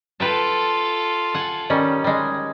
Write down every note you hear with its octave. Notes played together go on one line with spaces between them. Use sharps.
F4 A4 B4 G5 A5
F#5 G#5
D#3 G3 C#4
G3 G#3